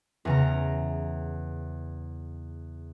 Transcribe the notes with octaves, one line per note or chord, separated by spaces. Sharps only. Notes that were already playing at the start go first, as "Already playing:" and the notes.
E2 C#3 A#5